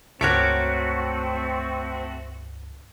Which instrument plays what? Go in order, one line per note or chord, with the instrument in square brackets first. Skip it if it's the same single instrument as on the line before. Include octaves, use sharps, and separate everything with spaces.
[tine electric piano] C#2 G2 [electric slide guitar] A3 F#4 [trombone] C4 [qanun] A#4 C#5 D6